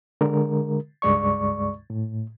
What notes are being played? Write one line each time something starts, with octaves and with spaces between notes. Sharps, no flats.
D3 G#3 A#4
C#2 G2 G#3 D5 C#6
A2